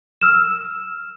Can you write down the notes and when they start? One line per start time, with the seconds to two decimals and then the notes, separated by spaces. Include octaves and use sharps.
0.21 E6 F6 E7